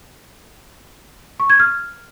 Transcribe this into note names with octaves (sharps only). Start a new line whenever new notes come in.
C#6
G#6
F6